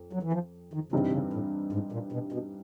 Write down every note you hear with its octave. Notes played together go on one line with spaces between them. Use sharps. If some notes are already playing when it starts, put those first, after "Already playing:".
Already playing: F2
F#3
E3
F3
D#3
G2 C#3 E3 G3 C4 D#4
C3
C#3
A2
G#2
A#2
B2
B2